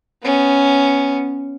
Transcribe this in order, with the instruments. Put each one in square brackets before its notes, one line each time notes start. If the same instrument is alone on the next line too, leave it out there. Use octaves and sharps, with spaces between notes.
[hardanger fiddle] B3 C#4